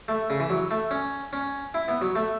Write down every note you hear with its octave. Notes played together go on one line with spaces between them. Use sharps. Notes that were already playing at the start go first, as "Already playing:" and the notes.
A3
C#3
E3
F#3
A3
C#4
C#4
E4
B3
F#3
A3